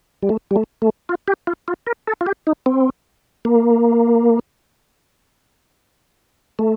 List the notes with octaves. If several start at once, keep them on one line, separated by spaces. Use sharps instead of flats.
G3
A3
G3
A3
A3
F4
G4
F4
F4
A#4
A4
F4
G4
D#4
C4
A#3
A3